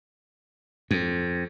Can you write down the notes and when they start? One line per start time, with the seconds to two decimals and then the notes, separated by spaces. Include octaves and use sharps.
0.91 F2